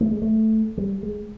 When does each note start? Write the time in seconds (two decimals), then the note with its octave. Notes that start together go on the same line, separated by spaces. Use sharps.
0.01 A3
0.11 G#3
0.22 A3
0.77 G3
1.03 G#3